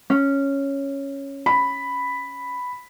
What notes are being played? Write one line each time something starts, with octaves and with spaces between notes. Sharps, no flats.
C#4
B5